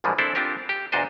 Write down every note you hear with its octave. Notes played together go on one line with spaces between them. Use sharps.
A#1 G#2 E3 F3 G3 G#3
C4 D4 E4 A4 C5 D5
C4 D4 F4 G4 A#4
G4
E2 A#2 D4 F#4 C5 D#5